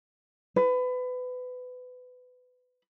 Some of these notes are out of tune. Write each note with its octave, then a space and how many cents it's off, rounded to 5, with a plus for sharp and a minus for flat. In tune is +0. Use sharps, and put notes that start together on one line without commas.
B4 +25